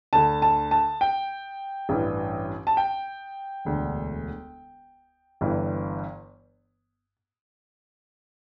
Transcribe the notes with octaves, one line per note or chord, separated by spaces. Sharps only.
D2 D3 A5
A5
A5
G5
A1 G2 E3
A5
G5
E1 D2 D3
G1 G2 E3